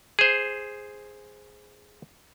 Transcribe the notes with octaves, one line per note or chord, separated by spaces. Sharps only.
G#4 C5